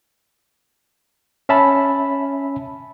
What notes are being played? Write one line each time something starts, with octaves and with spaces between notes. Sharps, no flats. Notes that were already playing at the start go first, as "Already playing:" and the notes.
C#4 E5 A5 B5